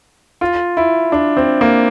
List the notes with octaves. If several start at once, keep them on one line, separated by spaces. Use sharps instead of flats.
F4
E4
D4
C4
A#3